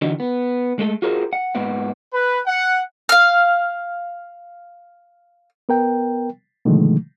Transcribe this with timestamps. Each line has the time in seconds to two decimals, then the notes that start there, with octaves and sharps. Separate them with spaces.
0.02 D3 E3 D4 D#4 F#4
0.20 B3
0.79 G#3 A3 A4
1.02 F4 F#4 G#4 A#4 C5
1.33 F#5
1.55 G#2 A#3 B3 F#5
2.14 B4
2.47 F#5
3.09 F5 F6
5.69 B3 A#4 G5
6.65 B2 D3 D#3 F3 G#3 A3